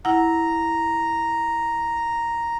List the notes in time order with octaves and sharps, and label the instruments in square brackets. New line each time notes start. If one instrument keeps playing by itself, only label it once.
[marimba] E4 F#5 [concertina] A#5